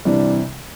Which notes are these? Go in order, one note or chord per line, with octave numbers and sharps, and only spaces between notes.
C3 E3 G3 D4